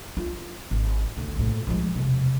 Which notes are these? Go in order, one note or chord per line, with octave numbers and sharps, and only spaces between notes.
F4
G#1
D2 C#3
A#1 A2
F3 G#3
E1 C3